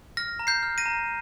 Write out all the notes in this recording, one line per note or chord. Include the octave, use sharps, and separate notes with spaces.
F6 A#6
A#5
G6 C7
F6
A#6 D#7
A#5